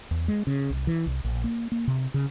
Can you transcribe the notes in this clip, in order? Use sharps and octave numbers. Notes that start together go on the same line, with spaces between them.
E2
G#3
C#3
C2
E3
C2
A#1
A#3
A#3
C3
C#3